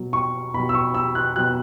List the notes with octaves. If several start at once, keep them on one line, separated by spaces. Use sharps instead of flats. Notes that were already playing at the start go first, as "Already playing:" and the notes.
Already playing: B2 F#3
C#6
B2 F#3 B5
E6
C#6
E6
F#6
B2 F#3 F#6